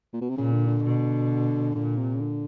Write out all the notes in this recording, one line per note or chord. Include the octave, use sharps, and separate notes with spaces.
A#2
B2
C3
A#2 C#3
D3
D3
B2
A#2 D3
C3
C#3
D3